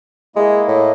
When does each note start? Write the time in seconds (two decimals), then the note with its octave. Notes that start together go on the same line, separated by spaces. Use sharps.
0.36 G#3 A#3 E4 D#5
0.68 A2